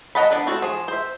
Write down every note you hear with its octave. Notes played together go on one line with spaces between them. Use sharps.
A#4 D#5 F#5 A5 B5
B3 D4 B4 F#5
C4 F#4 A4
F3 G#4
C5 E5